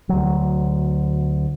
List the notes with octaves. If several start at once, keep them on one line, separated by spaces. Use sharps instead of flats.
D2 F#3